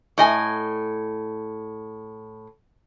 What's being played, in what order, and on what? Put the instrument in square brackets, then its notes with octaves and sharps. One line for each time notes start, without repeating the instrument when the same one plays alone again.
[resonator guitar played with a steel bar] A2 D#5 G#5